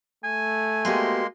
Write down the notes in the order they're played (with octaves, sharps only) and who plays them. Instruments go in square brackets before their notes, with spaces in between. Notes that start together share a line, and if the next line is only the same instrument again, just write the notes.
[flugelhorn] A3 [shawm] G#5
[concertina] G#3 A#3 C6 [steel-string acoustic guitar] B3 F#4 G4